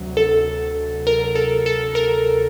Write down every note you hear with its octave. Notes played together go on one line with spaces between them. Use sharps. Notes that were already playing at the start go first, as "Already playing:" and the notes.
Already playing: D2 C3 F#3
A4
A#4
A4
A4
A#4